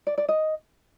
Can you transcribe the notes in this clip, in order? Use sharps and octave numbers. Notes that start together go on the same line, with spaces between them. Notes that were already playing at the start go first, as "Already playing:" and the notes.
D5
D5
D#5